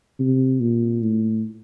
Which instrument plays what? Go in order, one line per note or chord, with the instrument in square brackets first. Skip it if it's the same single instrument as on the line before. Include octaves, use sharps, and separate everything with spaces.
[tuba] C3
A#2
A2